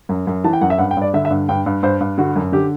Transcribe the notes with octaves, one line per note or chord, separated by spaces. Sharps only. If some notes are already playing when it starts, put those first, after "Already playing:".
F#2
F#2
E3 A5
G5
F#2 F#5
E5
G2 F#5
G5
G2 D5
D3 E5
E5
G2
G2 G5
G2
G2 C5
G2
D3 F#4
F#2
D3 G4